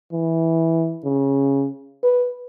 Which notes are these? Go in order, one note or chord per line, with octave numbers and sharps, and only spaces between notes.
E3
C#3
B4